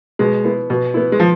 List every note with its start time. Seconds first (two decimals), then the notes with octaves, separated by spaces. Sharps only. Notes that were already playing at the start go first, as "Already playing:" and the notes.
0.19 B2 G#3
0.44 B3 E4
0.70 B2
0.94 B3 E4
1.12 G#3
1.20 F3